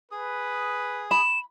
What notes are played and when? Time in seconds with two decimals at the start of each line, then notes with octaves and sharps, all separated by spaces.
0.11 G#4 B4 D#6
1.11 B5 E7